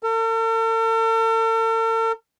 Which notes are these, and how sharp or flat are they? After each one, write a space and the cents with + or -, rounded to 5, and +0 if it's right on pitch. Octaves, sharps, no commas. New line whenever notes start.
A4 +45